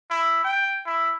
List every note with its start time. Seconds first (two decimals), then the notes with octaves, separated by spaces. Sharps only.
0.10 E4
0.44 G5
0.86 E4